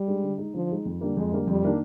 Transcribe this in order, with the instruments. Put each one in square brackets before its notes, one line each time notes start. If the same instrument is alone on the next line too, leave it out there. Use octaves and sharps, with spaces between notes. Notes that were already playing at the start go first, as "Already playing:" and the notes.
Already playing: [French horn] G3
[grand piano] G#3 D4
D3
G#3 D#4
[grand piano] D3 [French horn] F3
[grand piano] G#3 D#4
F2
D3 G3 A#3
[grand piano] F2 [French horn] G#3
[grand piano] D3 G3 A#3
[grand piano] F2 [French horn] G3
[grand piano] D#3 A#3 D4